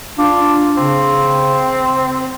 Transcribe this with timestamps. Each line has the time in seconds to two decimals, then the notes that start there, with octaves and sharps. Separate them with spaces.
0.18 D4 F4
0.77 C#3 C4